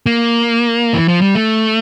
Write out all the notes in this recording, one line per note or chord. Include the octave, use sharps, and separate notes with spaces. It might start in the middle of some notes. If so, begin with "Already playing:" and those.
A#3
E3
F3
G3
A3